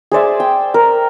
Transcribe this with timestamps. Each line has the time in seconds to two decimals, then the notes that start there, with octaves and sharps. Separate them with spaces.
0.12 G#4 C5 D5 E5
0.40 G5
0.74 A#4